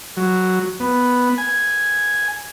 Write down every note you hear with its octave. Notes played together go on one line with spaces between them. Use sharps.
F#3
B3
G#5